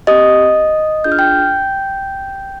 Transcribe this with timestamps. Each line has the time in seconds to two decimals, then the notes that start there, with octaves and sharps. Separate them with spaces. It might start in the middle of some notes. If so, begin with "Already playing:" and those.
0.07 C4 G4 D#5 D#6
1.04 D4 F4 G#4 G6
1.12 F6
1.19 G5 G6